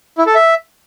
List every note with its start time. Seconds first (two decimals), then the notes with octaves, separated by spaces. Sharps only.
0.18 E4
0.27 A4
0.35 E5